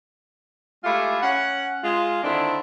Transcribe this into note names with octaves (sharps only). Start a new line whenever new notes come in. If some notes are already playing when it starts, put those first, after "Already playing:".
G#3 A3 E4 F4 G4
C#4 F#5
G#3 F4
D3 D#3 C4 D4 E4